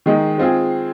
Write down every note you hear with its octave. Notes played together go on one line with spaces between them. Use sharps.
D#3 G#3 D#4
G#3 C4 F4 G#4